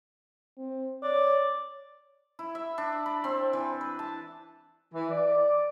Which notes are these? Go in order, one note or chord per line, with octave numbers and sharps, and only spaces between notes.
C4
C#5 D5
E4
E5
D4
B5
C4
E3
B4
A5
E3
D5